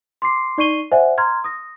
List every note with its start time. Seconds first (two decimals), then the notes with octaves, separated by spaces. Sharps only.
0.22 C6 D6 C7
0.58 D#4 D5 C#6 C7 D#7 G7
0.92 C5 D5 E5 F#5 G#5
1.18 A#5 C6 F6 G#6
1.44 D#6 A#6